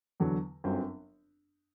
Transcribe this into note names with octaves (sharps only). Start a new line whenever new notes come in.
E2 D3 F#3
G1 F#2 F#3 C4